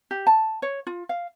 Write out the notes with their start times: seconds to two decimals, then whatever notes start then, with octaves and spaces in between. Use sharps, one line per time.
0.11 G4
0.27 A5
0.62 C#5
0.87 F4
1.09 F5